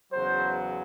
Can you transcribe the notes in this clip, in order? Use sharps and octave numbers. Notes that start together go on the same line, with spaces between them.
E2 C#3 F#3 C5